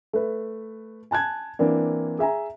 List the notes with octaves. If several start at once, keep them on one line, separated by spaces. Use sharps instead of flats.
A3 B4
G#5 A5 F#6 G#6
E3 A#3 C4 D4
G#4 E5 G#5 A#5